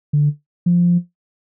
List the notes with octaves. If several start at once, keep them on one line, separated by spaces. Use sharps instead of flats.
D3
F3